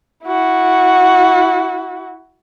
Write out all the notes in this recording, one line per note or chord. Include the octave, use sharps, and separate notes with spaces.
E4 F#4